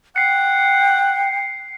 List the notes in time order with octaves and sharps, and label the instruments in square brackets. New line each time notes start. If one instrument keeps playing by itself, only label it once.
[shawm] F#5 [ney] G5 [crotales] C7 C#7